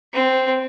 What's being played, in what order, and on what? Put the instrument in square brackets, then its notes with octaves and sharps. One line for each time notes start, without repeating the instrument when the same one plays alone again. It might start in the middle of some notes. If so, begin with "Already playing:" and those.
[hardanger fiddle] C4